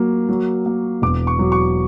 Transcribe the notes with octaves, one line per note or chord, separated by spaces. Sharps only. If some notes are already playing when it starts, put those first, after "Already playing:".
Already playing: F#3 A#3
F#3
A#3
E1 D6
C#6
F#3
C#6